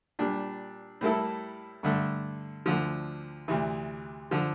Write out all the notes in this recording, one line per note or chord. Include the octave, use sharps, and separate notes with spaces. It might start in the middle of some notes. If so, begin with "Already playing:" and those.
A#2 G3 D4
A2 G3 A#3 E4 A4
G2 D3 A3
D2 D3 F3
D2 C3 E3
D3 F3